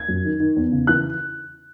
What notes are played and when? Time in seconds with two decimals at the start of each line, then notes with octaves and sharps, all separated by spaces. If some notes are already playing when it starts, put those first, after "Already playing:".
Already playing: G#6
0.09 F#2
0.25 D#3
0.40 D#3
0.56 E2
0.72 C#3
0.87 E3 F#6